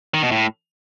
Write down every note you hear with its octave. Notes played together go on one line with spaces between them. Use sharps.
D#3
B2
A2